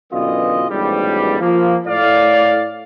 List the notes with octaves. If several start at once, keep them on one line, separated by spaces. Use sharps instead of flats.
F#2 B2 D3 E3 F4 D#5
A1 G#2 B2 F3 G3
F3 A#3
A2 D5 F5